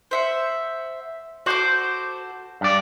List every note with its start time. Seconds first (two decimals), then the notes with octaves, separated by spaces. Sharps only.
0.11 C5 E5 F#5
1.46 F#4 A4 C5 D6
2.61 G2 D5